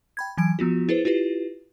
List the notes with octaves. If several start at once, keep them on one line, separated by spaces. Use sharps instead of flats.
G5 B5 G#6
E3 F#3 G#5 G#6 D7
F3 B3 F4 F#4
E4 G#4 B4 C5
E4 F4 G4 B4